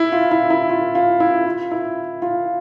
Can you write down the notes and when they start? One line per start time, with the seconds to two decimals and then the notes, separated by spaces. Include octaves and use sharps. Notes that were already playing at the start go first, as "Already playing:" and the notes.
Already playing: E4
0.12 F4
0.31 E4
0.50 E4
0.69 F4
0.95 F4
1.20 E4
1.46 F4
1.71 E4
2.22 F4